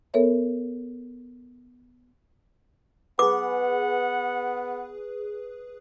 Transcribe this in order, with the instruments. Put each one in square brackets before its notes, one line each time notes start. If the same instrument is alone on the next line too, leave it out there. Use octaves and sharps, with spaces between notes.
[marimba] B3 A4 A#4 C#5 E5
[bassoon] B3 [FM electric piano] G#4 B4 [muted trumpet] F#5 [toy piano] D6